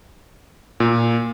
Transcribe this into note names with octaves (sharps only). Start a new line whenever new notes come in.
A#2